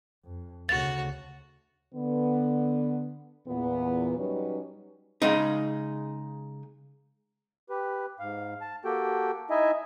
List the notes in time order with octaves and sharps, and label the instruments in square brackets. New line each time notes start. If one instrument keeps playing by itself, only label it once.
[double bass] F2
[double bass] D2 C#3 [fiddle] F#4 [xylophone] A6
[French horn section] D3 B3
E2 A#2 B3
F#3 G3 C#4 D#4 B4
[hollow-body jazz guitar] C#3 G#3 D#4
[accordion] G4 B4
G#2 F5
A5
A#3 F#4 G4 A4 G5
D#4 E4 D#5 E5 G#5